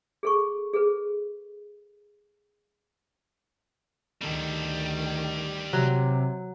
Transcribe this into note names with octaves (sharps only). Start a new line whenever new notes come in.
G#4 A4 C#6
G#4 A4 B4
D2 D#3 G3 A4
C3 F#3